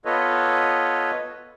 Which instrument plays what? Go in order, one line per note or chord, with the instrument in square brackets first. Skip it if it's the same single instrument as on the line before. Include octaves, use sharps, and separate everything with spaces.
[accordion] B3 F4 A4 B4 C#5 D#5